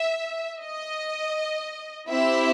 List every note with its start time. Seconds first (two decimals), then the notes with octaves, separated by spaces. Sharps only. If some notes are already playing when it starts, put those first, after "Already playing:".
Already playing: E5
0.64 D#5
2.09 C4 E4 G4 E5